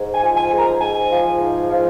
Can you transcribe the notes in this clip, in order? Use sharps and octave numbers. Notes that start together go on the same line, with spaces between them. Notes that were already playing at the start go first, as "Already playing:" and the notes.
Already playing: G#2
G#5
F3
G#5
G#2
A#5
G#2 G#5
F3
G#2
F3